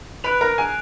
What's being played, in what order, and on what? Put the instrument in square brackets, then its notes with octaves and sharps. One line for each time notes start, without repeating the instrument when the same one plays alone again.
[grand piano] B4 B5 [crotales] F#6 D7 F7
[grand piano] A#4 A#5
G#4 G#5